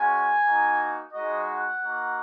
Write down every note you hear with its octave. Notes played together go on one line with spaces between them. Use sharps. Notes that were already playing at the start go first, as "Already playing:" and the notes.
Already playing: G#3 C#4 F#4 G#5
A#3 D#4 F#4
G#3 D#4 F#4 D#5
F#5
A#3 D#4 F#4